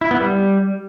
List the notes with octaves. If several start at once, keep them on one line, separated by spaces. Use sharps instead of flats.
E4
B3
G3